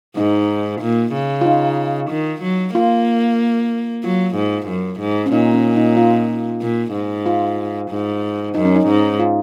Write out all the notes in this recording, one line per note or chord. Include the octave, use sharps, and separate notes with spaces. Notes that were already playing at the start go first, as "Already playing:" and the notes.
G#2 D#4
A#2
C#3
F4
D#4
D#3
F#3
A#3 F4
F#3 F4
G#2
F#2
G#2
C#4
A#2 D#4
C#4
D#4
F4
A#2
G#2
F4
G#2
F#2 D#4
C#4
D#4
G#2
F4